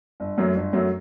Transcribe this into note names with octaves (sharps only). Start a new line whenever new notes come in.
G1
F#2 F#3 A3
G1
F#2 F#3 A3